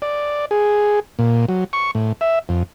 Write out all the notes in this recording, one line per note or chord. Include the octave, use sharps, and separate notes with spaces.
D5
G#4
A#2
F#3
C#6
A2
E5
F2